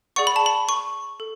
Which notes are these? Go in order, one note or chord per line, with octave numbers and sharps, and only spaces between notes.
G#4 D5 F#5 C#6
B5
A5
B5
C#6
A4